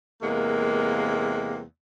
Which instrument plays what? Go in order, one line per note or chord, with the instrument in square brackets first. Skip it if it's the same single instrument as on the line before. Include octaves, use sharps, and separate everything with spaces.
[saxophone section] E2 C3 G#3 A#3